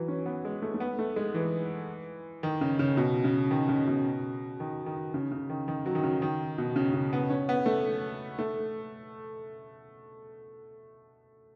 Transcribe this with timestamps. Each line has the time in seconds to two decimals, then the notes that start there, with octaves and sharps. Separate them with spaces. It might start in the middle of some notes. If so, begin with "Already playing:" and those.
Already playing: E3 F#3
0.08 C#4
0.26 B3
0.45 G#3
0.62 A3
0.74 A3
0.80 B3
0.99 A3
1.16 G#3
1.34 E3
2.43 D#3
2.61 C#3
2.79 C#3
2.97 B2
3.24 C#3
3.51 D#3
3.69 C#3
3.87 B2
4.60 D#3
4.86 D#3
5.14 C#3
5.31 C#3
5.49 D#3
5.68 D#3
5.86 F#3
5.95 D#3
6.03 C#3
6.22 D#3
6.58 B2
6.76 C#3
6.94 C#3
7.13 B3
7.30 C#4
7.49 B3
7.66 A3
8.39 A3